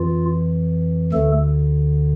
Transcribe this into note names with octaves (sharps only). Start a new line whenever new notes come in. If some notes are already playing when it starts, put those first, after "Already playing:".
Already playing: F2 E3 F4
D2 D3 A3 A4